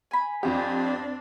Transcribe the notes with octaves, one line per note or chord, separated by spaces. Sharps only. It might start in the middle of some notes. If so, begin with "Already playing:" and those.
G#5 B5
F2 C4 D4 G4